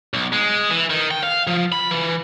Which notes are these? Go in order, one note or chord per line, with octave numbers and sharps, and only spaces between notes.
B1
G#3
E3
D#3
G5
F5
F3
B5
E3